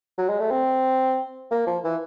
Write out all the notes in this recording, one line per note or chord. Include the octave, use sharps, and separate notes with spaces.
F#3
G#3
A3
C4
A#3
F3
E3